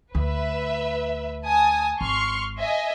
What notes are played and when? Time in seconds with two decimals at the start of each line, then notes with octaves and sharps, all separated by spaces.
0.15 D2 B4 E5
1.45 G#5 A5 D#6
2.01 G#1 C6 C#6 F6
2.59 D#5 E5 G#5